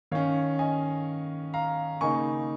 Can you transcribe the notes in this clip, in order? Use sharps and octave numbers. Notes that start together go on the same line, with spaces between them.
D#3 C#4 C#5 F5
D#5 G#5
F5 A#5
C#3 A#3 D#4 G#5 C#6